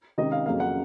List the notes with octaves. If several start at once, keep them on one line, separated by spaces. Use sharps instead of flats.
C#2 C3 D#3 D#5
F5
F2 C#3 F#3 A#3 F5
F#5